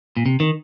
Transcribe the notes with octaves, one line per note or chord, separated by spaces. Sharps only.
A#2
C3
D#3